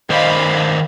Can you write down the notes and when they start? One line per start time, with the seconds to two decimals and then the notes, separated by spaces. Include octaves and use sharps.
0.10 D#3 C5 D5 D#5 F5 B5